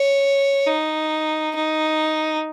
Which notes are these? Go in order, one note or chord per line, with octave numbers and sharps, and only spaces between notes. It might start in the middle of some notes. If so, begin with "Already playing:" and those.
Already playing: C#5
D#4
D#4